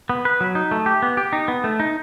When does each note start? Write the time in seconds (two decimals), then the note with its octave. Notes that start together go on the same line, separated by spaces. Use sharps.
0.10 B3
0.25 B4
0.41 F#3
0.55 D#4
0.71 A3
0.86 G4
1.02 B3
1.17 G4
1.33 D#4
1.48 B3
1.64 A3
1.80 D#4